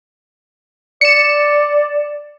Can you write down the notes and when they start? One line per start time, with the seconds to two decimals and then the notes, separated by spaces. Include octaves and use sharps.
1.01 D5 C#7 E7